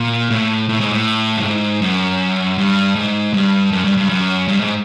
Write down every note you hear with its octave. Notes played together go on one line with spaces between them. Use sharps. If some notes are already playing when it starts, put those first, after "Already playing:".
Already playing: A#2
A2
A2
G#2
A2
G2
G#2
F#2
G2
G#2
G2
F#2
G2
G2
F#2
G2
G#2